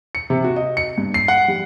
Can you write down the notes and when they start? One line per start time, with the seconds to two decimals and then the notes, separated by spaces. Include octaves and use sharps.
0.15 C#7
0.30 C3
0.44 F#4
0.56 D#5
0.77 C#7
0.98 G2
1.14 C7
1.28 F#5
1.48 G3